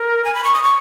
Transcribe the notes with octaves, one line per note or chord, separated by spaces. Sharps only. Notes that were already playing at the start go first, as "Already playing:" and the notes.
Already playing: A#4
G#5
B5
C#6
D#6
C#6